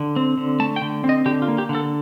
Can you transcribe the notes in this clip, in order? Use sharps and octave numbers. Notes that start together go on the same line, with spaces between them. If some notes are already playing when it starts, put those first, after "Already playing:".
Already playing: D3
C4
D3
A3 A5
G5
D3
C4
D#5
D3 G4
F4
A#3
G4
D3
A4